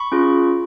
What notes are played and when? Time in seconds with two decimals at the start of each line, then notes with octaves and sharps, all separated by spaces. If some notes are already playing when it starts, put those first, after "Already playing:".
Already playing: B5 C#6
0.12 C#4 F4 G#4